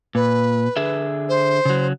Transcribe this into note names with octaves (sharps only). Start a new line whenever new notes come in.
A#2 B4
D3 G#4 E5
C5
C#3 F#3